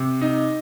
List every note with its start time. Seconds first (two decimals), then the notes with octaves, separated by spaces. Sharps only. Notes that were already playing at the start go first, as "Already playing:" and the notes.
Already playing: C3
0.21 D#4